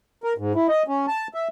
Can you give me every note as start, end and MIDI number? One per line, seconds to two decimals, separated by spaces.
0.24 0.33 70
0.38 0.53 44
0.55 0.67 64
0.69 0.83 75
0.88 1.06 61
1.08 1.27 81
1.34 1.48 76